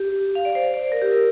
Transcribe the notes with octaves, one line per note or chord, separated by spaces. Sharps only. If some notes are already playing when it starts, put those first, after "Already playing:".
Already playing: G4
F5
D5
C5
D5
A#4
G4
A#4